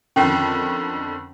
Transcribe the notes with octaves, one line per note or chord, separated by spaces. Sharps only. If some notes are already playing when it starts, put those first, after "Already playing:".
F2 D3 D#3 C#4 G5